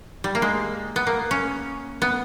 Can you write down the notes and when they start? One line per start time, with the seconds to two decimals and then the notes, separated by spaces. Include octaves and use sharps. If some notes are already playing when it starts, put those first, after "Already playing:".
0.24 G3
0.35 A#3
0.42 G#3
0.96 B3
1.07 A#3
1.31 C#4
2.02 B3